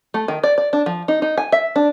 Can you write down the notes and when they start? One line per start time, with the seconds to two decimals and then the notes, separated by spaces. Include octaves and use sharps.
0.14 A3
0.28 D#3
0.44 D5
0.58 D5
0.73 D4
0.86 F3
1.08 D#4
1.22 D#4
1.38 G#5
1.52 E5
1.76 D4